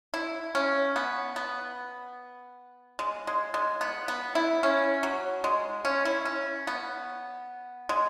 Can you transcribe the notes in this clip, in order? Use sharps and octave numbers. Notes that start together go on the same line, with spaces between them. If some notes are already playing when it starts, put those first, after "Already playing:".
E4
C#4
B3
B3
G#3
G#3
G#3
B3
B3
E4
C#4
F#3
G#3
C#4
E4
C#4
B3
G#3